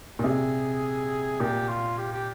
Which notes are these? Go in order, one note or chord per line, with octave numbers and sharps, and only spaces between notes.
A#2
C3 G#4
A#2 G4
F4
G4
G4